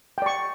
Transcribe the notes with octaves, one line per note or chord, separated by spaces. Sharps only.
D5 G5 C#6